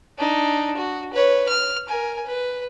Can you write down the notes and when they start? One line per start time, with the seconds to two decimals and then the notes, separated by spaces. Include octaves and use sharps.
0.18 D4 D#4
0.77 F#4
1.13 B4 C#5
1.48 F6
1.88 A#4 G#5
2.26 B4